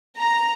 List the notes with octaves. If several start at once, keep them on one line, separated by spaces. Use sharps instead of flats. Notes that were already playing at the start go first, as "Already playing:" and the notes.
A#5